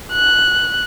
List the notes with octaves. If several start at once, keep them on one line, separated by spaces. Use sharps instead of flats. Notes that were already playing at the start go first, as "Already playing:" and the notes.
F#6